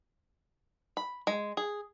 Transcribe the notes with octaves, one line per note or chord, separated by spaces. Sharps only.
B5
G#3
G#4